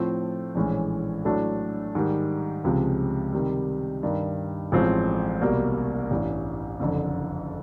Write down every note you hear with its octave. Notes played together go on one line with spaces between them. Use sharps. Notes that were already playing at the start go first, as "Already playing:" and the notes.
Already playing: A2 F3 A3 C4 F4
A#1 A2 E3 G#3 C#4
A2 F#3 A3 D4
G#2 D#3 G3
C#2 C3 F3 G#3
C3 D#3 G3
G2 D#3 G3
A1 A2 F3 G#3 C4
C2 B2 G3 A#3
A1 G2 E3
F#1 F2 D3